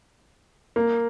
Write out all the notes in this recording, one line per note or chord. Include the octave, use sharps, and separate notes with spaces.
A#3